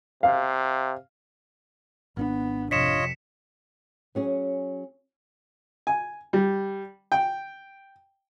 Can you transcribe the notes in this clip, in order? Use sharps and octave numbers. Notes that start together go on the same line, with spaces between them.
C3 F5
G#1 B3 C4 D4
F2 C3 F4 C#5 D#5 B6 C#7 E7
F#3 C#4 G#4
G#5
G3
G5